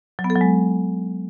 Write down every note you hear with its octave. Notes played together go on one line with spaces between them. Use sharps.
F#3
B3
A4
F#3
G#3